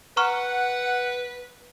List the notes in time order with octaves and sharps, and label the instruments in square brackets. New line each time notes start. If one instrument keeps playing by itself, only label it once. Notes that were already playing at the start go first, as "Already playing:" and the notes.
[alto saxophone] B4 [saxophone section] F#5 [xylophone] A#5 C#6 F6